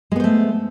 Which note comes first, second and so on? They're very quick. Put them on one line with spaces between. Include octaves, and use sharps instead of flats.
G#3 B3 C5 A3